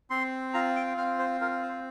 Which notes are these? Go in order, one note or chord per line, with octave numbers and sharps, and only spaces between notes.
C4 C6
F4 A#5
G5
C4 F5
C5
F4 A#4
C5